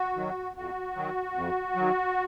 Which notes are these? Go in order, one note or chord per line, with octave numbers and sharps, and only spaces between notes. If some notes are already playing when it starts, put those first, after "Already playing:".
Already playing: F#4
D#3 F#3
F2 F#4
D#3 F#3
F2
D#3 F#3